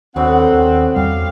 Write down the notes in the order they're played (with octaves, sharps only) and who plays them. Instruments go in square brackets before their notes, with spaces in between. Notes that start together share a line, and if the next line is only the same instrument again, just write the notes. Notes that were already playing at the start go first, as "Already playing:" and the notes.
[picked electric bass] D#2 [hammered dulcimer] D3 F#3 B3 [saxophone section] C4 [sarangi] F#5
[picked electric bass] D#2
[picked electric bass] E2 G3 [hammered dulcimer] G4 G5 [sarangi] F5